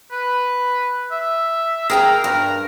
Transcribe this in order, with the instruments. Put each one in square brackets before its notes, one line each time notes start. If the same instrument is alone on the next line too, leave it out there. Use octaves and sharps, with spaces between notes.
[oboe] B4
E5
[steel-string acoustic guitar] G#4 G5 A#5 [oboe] A#4
[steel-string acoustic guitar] G2 [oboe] A#4